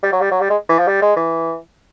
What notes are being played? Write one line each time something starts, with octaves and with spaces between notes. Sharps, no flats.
G3
F#3
G3
F#3
G3
G#3
E3
F3
G3
G#3
E3